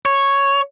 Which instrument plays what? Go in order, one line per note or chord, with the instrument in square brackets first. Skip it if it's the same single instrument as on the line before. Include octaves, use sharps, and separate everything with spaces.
[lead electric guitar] C#5